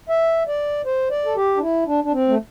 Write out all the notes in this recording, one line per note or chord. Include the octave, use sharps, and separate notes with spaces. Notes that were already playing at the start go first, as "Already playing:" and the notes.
E5
D5
C5
D5
A4
G4
D4
E4
D4
D4
C4
A3